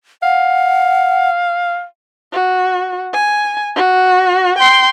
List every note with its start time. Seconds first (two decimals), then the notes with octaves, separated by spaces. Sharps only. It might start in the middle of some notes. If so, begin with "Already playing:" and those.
0.23 F5 F#5
2.33 F#4
3.13 G#5
3.75 F#4
4.59 G5 C6